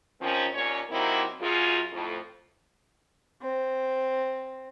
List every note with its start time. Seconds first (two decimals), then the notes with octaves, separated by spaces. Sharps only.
0.20 D#2 D#3 F3 C4 C#4
0.53 D#2 A#2 C#4 C#5
0.90 C3 F#3 A#3 C4 D#4 E4
1.41 F#2 F4 G#4
1.91 F2 A2
3.42 C4